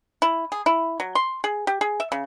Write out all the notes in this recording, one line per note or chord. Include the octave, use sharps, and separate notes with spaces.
E4
G#4
E4
F#3
C6
G#4
G4
G#4
E5
C#3